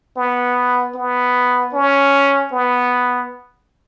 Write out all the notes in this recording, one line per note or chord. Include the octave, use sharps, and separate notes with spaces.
B3
B3
C#4
B3